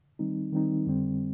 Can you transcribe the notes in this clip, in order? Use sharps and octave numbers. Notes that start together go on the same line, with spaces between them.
D#3 G3 C4 D#4
D#3 G3 C4 D#4
F2 D3 G3 C4